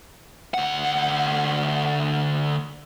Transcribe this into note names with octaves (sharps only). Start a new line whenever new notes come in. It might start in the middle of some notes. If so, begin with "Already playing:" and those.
D2 F#5